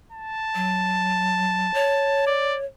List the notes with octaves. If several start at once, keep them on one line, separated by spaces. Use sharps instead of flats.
A5
F#3
C#5
D5